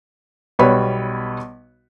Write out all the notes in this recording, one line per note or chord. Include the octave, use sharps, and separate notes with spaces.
B1 G3 B4 C#5 B5